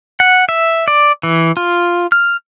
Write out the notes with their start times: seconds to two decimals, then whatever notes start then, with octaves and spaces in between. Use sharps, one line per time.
0.20 F#5
0.49 E5
0.88 D5
1.23 E3
1.57 F4
2.12 F6